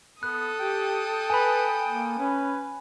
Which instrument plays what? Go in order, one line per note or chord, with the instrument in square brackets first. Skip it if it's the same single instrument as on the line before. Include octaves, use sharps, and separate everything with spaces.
[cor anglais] B3 [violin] A4 D#6 [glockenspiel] F#6
[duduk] G4 [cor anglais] G5
[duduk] B4 [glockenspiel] G#5 B5
[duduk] A#3
[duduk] C#4 [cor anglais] B4